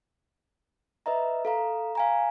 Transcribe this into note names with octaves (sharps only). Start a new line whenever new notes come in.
B4 D#5 E5 A#5
A4 F5 A#5
F5 G#5 A#5